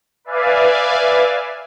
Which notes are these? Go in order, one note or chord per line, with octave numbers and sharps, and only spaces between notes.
B4 D5 E5 F5 G#5